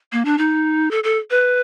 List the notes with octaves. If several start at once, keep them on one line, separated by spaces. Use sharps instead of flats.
A#3
D4
D#4
A4
A4
B4